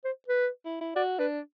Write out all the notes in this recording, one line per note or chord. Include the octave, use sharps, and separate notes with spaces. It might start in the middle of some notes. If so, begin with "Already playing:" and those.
C5
B4
E4
E4
F#4 D5
D4 B4